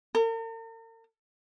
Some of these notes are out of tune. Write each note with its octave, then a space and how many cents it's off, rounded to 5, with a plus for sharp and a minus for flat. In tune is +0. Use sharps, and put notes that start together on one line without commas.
A#4 -45